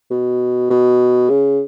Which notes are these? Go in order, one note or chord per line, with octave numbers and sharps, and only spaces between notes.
B2
B2
C#3